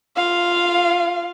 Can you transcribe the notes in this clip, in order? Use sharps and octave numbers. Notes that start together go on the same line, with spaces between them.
F4 F5